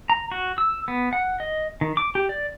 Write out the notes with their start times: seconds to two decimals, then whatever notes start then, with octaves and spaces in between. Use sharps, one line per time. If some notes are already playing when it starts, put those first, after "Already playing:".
0.10 A#5
0.32 F#4
0.58 E6
0.88 B3
1.13 F#5
1.40 D#5
1.81 D#3
1.97 D6
2.15 G4
2.29 D5